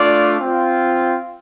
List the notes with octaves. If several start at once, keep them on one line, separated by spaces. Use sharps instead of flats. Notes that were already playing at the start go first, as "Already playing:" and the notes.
Already playing: A3 D4 F4 D5
C4 F4